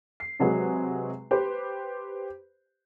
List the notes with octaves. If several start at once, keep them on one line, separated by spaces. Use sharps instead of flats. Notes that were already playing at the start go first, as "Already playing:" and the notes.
C7
C3 F#3 G#3 F#4 G#4 B4
G4 B4 C5